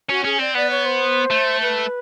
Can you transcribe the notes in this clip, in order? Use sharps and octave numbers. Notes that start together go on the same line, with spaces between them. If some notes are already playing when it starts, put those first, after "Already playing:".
C#4 F#4
C#4 G#4
C4 D5
B3 D5
C#5
C5
A3
B4